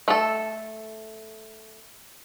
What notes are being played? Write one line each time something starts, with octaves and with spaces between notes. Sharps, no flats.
A3 A4